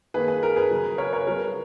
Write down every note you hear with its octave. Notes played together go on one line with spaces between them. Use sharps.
D#3 A#3 G#4 B4
G#4
A#4
G#4 B4
C#3 F#3 B3
A#4 C#5
A#4 C#5
C#3 F#3 B3 A#4